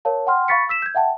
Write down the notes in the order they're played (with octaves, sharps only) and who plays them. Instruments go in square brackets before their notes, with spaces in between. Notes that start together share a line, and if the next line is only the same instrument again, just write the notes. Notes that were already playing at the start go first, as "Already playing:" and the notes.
[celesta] A#4 C#5 F5 A5
F#5 G5 C6 F6
F5 B5 C#6 A6 B6 C#7
E6 B6 E7
G6 G#6
E5 F#5 G5 A5